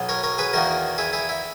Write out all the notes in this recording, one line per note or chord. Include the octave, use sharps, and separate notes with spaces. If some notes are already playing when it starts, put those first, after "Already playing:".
Already playing: B1 B2 F#3 B3
A#4 C#5
A#4 C#5
G#4 B4
E2 D#3 A#3 F#4 A#4
E4 G#4
E4 G#4
E4